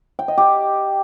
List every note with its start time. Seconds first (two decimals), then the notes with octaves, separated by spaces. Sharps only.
0.19 G5
0.28 D#5
0.38 G4